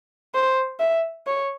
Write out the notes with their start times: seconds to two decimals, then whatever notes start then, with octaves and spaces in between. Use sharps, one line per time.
0.35 C5
0.80 E5
1.27 C#5